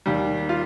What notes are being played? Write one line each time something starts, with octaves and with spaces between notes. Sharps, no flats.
D#2 D#3 G3
F4